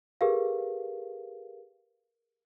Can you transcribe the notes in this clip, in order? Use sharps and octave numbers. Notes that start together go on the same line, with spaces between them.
G4 G#4 A#4 B4 F5